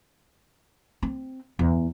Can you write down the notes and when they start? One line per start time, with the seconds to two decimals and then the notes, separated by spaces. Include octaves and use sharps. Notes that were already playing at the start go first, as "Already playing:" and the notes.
1.03 C4
1.59 E2